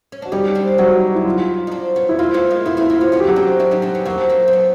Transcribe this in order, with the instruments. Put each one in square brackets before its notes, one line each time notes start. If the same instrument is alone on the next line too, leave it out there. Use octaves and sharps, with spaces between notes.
[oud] C#4
[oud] D4 [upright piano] F#4
[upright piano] G3 G4 [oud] C#4 D#4
[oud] C4 D4
[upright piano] F#3 F#4 [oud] C#4 D#4
[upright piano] E4
F4
[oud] D#4
C4 D4
B3 C#4
[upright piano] E4
[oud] A#3 C4 [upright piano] F4
[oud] A3 B3
G#3 A#3
[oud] A3 B3 [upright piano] E4
[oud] A3 B3 [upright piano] E4
[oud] A#3 C4
[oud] B3 C#4 [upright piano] F4
[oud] B3 C#4 [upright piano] F#4
[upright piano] G4
F#3 F#4
[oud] C4 D4
D4 E4
C#4 D#4
C4 D4
B3 C#4
[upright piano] F#3 F#4 [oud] A#3 C4
[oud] A#3 C4
C4
B3 C#4